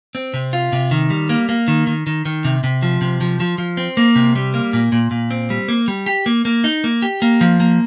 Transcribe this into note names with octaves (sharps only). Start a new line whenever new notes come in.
C4
C3
F4
C3
D#3
G3
A#3
A#3
D#3
D#3
D#3
D#3
C3
C3
F3
C3
F3
F3
F3
C4
A#3
C3
G3
A#3
A#2
A#2
A#2
C4
G3
A#3
G3
G4
A#3
A#3
D#4
A#3
G4
A#3
F3
A#3